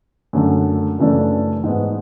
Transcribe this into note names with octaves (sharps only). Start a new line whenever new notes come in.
F#2 D3 A3
F#2 C#3 E3 A3 D4
G#2 G#3 B3